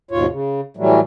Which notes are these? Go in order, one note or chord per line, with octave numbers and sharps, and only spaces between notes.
D#2 G#2 B2 F4 C#5
C#3
A2 E3 F#3 G3 A3